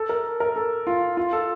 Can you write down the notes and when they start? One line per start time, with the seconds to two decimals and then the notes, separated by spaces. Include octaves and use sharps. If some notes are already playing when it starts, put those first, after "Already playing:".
Already playing: A4
0.09 A#4
0.40 A#4
0.56 A4
0.87 F4
1.17 F4
1.33 A4